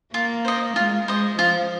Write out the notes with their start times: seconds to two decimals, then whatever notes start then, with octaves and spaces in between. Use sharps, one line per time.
0.14 A#3 F4
0.45 C5 D#5
0.76 G#3 F4
1.08 G#3 C5 D#5
1.39 F3 F4